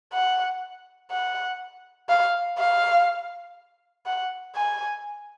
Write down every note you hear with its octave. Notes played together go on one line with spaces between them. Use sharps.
F#5
F#5
F5
F5
F#5
G#5